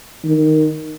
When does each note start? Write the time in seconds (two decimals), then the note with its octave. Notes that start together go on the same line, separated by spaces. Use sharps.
0.24 D#3